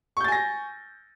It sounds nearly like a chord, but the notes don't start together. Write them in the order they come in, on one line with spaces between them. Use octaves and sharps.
C#6 G6 A6 G#5 A#6